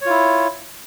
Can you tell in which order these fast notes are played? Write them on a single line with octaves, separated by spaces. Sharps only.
C#5 F4 E4